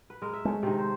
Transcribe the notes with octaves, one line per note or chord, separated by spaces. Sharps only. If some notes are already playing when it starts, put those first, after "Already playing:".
B4
G#3 A#4
E5
G#3 A3 C#5
C3 D#3
C5